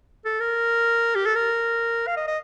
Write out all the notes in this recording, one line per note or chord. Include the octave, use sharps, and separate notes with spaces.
A4
A#4
G4
A4
A#4
F5
D#5
D#5